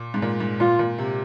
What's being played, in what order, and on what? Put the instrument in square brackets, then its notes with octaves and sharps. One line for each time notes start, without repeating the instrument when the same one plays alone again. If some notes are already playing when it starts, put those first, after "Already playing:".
Already playing: [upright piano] A#2
G#2
A#2
G#2
[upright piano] A#2 [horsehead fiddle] F4
[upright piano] A#2
C3